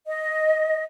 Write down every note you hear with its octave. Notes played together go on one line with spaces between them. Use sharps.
D#5